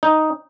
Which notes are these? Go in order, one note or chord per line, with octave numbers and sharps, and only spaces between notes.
D#4